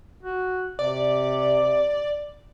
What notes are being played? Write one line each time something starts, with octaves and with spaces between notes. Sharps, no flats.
F#4
C3 D5